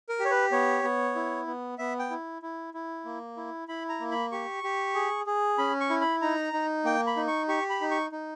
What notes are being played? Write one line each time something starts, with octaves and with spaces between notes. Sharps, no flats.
A#4
G4
C#5
B4
B3 C#5
B3
E4
B3
B3 E5
G5
E4
E4
E4
A#3
E4
E4 B5
A#5
A#3
B5
G4 C#6
G4
G#4
G#4
C#4 B5
C#6
E4
B5
D#4 A#5
D#4
A#3 G5
B5
D#4
C#6
G4 C#6
B5
D#4
C#6
D#4